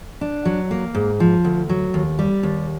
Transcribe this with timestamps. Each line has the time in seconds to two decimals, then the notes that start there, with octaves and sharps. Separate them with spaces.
0.21 D4
0.45 F#3
0.71 A#3
0.95 G#2
1.20 F3
1.45 D2
1.69 F#3
1.94 D#2
2.19 G3
2.43 D#2